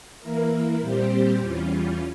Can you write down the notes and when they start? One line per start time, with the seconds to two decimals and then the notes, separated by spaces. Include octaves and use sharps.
0.21 E3 A#3 E4 A#4
0.81 A#2 G3 C4 G4 C5
1.40 E2 E3 G3 C#4 F4